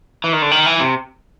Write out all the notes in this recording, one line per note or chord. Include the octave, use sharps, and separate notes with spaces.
E3
D#3
D3
D#3
E3
C3